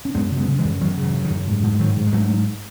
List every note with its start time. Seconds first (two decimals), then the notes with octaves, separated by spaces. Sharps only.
0.05 C#4
0.15 F#2 G#3 B3
0.32 C#3
0.37 G#3 B3
0.48 C#3
0.59 E3 G#3
0.64 F#2
0.81 F#2 D#3 F#3
0.98 C#3
1.03 E3
1.14 C#3
1.25 D#3
1.30 F#2
1.47 G#2
1.63 G#2
1.79 G#2 D#3 F#3
1.97 G#2
2.07 G#3
2.13 G#2 F#3 A3
2.29 G#2